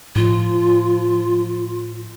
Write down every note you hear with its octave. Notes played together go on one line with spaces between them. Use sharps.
A2 F3 F4